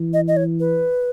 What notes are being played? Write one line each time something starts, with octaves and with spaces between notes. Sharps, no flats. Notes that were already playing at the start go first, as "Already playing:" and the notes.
Already playing: E3
D#5
D#5
C#5
B4